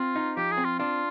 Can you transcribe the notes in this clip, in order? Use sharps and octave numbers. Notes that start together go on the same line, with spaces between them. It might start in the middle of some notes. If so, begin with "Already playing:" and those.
Already playing: C4 F4
D#4
F3 G4
G#4
C4
F4
D4 F4